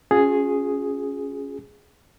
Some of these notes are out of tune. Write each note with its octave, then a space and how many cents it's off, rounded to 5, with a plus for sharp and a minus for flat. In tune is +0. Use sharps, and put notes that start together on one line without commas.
C#4 +0 F4 +45 G#4 +0